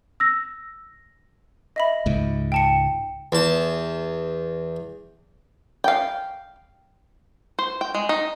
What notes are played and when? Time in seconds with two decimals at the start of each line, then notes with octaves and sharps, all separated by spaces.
0.20 E6 A#6
1.76 D#5 E5 B5
2.06 C#2 G#2
2.52 G5 A5 C#7
3.32 E2 A5
5.84 F5 G5
7.59 C5
7.81 G5
7.95 G#3
8.09 D#4